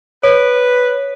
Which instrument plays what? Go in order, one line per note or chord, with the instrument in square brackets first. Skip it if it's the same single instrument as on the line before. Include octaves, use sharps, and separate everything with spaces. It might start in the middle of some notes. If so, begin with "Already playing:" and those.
[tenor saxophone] B4 [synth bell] C#5